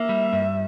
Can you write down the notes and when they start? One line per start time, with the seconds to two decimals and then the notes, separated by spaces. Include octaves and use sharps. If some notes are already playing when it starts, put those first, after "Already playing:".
Already playing: A#3 E5
0.09 G3
0.33 G2